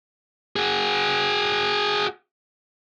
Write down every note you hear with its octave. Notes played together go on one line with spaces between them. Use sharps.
F#4 G#4